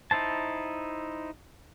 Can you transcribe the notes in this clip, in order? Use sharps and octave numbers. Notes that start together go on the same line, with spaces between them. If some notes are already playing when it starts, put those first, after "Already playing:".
D#4 E4 C5 A5